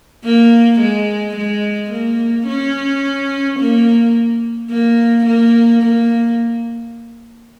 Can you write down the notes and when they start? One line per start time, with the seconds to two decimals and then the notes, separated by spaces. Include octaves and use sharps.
0.24 A#3
0.80 G#3
1.36 G#3
1.91 A#3
2.47 C#4
3.60 A#3
4.70 A#3
5.26 A#3
5.82 A#3